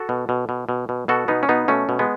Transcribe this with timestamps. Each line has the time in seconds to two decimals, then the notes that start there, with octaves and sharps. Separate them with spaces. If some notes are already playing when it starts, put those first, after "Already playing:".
Already playing: F#4 A4
0.09 B2
0.29 B2
0.49 B2
0.69 B2
0.89 B2
1.08 B2 F#4 A4
1.28 B2 B3 D#4
1.43 C#4
1.49 B2 B3 D#4
1.68 B2 A3 C#4
1.89 B2
1.99 G#3 B3